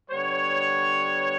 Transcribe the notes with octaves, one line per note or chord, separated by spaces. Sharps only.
D3 G3 B3 C#5